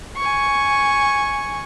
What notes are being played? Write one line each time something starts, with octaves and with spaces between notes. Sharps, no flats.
G#5 C#6